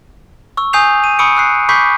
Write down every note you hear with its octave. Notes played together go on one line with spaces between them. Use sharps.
C#6 E6
G#5 D#6 G6 C7 F7
D#7
B5 C#6 D#6 E6 C#7 D7
E6 F#6 C7
B5 C#6 D6 G6 B6 C7